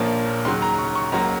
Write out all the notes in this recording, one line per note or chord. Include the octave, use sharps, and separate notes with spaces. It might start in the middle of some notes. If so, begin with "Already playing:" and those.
Already playing: A#1 A#2 F3 A#3 C#4
D#2 C#3 F#3 C6
A#5
C#6
C#6
C#2 C#3 F#3 A#3 A#5